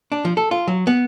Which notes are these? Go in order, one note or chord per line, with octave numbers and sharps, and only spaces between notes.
D4
F3
A4
F4
F#3
B3